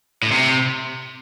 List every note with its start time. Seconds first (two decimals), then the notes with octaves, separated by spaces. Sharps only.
0.22 A2
0.31 C3